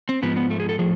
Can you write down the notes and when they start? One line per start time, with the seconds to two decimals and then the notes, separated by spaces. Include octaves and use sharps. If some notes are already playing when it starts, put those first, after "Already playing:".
0.09 C4
0.22 G#2 F3 B3
0.36 B3
0.50 A3
0.60 G#4
0.69 A4
0.79 A2 F3 G#4